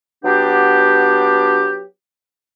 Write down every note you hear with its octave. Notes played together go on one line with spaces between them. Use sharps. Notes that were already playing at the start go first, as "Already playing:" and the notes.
F#3 B3 D4 G4